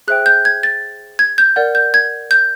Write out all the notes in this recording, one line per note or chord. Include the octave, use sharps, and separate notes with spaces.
G#4 C5 E5 G5 F#6
G6
G#6
A6
G#6
G6
A#4 D5 F#5
G6
G#6
G6